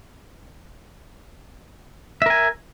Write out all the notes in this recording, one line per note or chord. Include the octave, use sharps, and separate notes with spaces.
A#4 E5 G#5